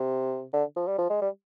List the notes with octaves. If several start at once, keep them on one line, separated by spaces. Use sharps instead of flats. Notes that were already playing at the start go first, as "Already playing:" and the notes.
Already playing: C3
D3
F3
G3
F3
G#3
G3